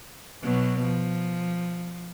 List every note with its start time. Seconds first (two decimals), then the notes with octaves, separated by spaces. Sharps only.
0.42 B2 F#3
0.83 F3